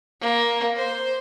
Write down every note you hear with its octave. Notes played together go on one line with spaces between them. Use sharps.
A#3
C5